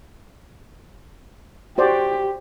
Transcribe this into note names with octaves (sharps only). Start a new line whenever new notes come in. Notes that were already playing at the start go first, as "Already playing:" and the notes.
F#4 G4 C5 D5